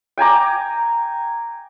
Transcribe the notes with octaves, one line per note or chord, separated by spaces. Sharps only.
G5 G#5 A#5 D6